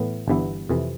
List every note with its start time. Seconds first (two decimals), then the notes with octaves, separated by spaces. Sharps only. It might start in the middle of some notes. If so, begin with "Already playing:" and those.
Already playing: A2 E3 B3
0.28 G1 G2 E3 B3 E4
0.69 F2 C3 E3